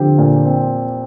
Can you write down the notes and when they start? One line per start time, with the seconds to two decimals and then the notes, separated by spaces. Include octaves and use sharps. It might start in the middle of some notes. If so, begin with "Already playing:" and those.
Already playing: D3 F3 C4 G4
0.18 A#2
0.45 C4